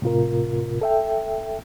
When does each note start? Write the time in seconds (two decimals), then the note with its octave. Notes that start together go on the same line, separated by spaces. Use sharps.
0.02 A2 C3 F4 A#4
0.82 A4 E5 G5